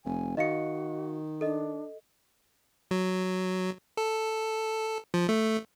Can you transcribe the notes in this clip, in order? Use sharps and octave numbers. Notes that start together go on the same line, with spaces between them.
F1 G#5
D#3 F#4 D#5 F5 C#7
D4 A4 D#5
F#3
A4
F3
A3